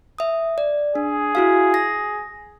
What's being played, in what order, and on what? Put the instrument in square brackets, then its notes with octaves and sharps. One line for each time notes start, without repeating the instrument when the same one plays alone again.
[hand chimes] E5 D#6
D5
[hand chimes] D4 [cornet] G#4
[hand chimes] E4 F#4 F5
A#6